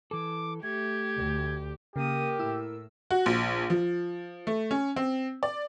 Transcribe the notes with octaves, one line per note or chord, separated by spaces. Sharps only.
E3 A4 D6
A3 G4 G#6
D2
C#3 A#3 G4 A#4 D#6
A2 E4 E6
F#4
A#1
F3
A3
C#4
C4
D5